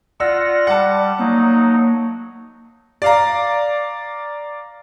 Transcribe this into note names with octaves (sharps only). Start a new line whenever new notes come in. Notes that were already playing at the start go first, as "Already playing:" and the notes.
F4 D5 F#5 E6 A#6
G3 F#5 A5
F#3 A#3 D#4
D5 F5 A#5